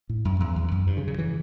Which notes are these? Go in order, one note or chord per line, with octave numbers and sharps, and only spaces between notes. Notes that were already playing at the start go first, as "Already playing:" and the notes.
A2
F#2
E2
E2
F#2
G2
C#3
C#3
E3